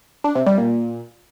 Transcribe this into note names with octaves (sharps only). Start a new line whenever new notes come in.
D4
C3
G3
A#2